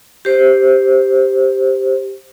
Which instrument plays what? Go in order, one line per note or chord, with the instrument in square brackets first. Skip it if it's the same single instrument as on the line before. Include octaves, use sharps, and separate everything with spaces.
[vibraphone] G4 C5